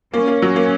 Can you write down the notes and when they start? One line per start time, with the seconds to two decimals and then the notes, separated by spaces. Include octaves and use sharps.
0.13 A#3 C#4
0.28 A#3
0.42 F#3
0.56 A#3